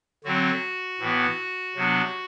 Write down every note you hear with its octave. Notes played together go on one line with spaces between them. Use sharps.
D3 F#3 C4 F#4
A2 E3 B3
C3 F#3 B3 D4